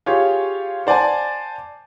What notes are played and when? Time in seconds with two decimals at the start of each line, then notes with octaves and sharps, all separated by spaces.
0.06 F4 G4 G#4 C#5
0.87 C5 D5 F#5 G#5 A5